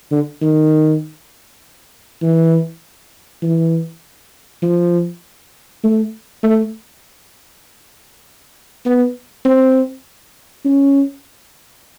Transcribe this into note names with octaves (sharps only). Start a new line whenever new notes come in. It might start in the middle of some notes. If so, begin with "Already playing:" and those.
D3
D#3
E3
E3
F3
A3
A3
B3
C4
C#4